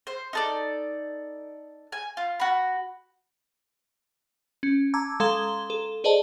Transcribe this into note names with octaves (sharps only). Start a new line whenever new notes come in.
C5
D#4 A4 D5
G#5
F4
F#4 B5
C#4
A5 A#5 D6 E6 G#6
G#3 A4 F5 A#5 C6 G7
A4
G#4 B4 C5 D5 D#5 A5